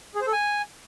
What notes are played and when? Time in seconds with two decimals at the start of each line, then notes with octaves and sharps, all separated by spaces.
0.15 G#4
0.21 C5
0.27 A4
0.33 G#5